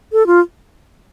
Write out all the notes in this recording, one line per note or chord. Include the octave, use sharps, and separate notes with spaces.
A4
F4